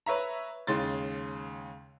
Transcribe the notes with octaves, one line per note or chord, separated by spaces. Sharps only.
B4 C#5 E5 A#5
D#2 C#3 G#3 C6 A6